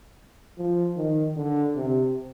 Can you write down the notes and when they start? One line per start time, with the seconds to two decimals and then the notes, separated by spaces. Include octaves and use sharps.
0.58 F3
0.97 D#3
1.36 D3
1.76 C3